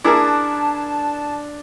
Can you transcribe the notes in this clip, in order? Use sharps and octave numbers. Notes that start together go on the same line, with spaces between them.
D4 E4 G#4 A#4 A5